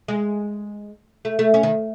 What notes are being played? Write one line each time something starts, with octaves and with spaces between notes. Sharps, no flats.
G#3
A3
A3
C#4
D#3